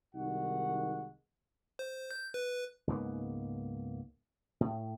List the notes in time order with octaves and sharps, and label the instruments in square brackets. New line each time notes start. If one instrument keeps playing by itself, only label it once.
[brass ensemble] C2 D#3 G#3 D#4 F#4 F#5
[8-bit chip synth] C5
G6
B4
[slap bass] C#2 G#2 A#3 B3
A2